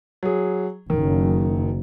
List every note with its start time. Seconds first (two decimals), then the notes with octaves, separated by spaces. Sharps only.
0.23 F#3 G#4
0.90 F#1 D#3